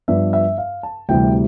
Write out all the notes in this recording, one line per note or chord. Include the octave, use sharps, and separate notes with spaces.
G2 F3 B3 D4 E5
E5
F5
A5
D2 C3 E3 G3 G5